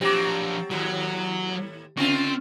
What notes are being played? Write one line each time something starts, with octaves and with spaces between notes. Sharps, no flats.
F3 F#3 C4 D4 G4 D6
D#2 A2 F#3
C#3 A3 C4 C#4 F4